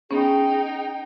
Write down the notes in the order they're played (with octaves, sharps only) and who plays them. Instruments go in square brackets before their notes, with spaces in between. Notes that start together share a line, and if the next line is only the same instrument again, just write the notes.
[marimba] B3 C#4 [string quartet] D#4 G5 [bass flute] G#4